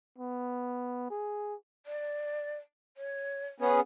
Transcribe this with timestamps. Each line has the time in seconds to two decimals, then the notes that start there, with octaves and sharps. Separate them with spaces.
0.18 B3
1.10 G#4
1.86 D5
2.97 C#5
3.60 B3 C#4 G#4 F#5